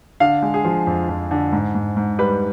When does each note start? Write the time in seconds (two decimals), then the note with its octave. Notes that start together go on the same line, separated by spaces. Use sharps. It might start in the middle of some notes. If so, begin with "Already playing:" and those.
0.20 D3 F5
0.42 G#3
0.54 G#4
0.65 F3
0.87 F2
1.09 F2
1.31 D3
1.52 G#2
1.75 G#2
1.96 G#2
2.19 G3 B4